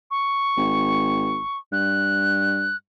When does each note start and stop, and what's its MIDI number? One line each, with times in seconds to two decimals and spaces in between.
0.11 1.58 85
0.57 1.41 32
1.72 2.71 43
1.72 2.76 90